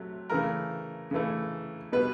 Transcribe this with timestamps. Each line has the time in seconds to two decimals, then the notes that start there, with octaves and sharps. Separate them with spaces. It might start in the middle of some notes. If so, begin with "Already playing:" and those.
Already playing: C3 F#3 A3
0.30 C#3 E3 A3 A#4
1.11 C#3 E3 A3
1.92 B2 G3 B3 B4